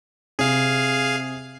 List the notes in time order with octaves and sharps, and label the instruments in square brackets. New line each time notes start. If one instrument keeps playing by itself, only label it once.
[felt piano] C3 [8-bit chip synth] G#4 F5